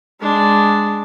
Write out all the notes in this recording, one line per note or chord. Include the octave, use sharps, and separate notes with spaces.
G#3 D4